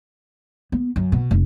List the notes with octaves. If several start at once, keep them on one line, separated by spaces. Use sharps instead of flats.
B3
F#2
B2
F1